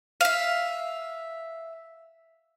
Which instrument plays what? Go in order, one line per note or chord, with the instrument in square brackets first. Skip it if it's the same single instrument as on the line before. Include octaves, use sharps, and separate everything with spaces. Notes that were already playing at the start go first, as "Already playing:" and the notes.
[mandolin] E5 F5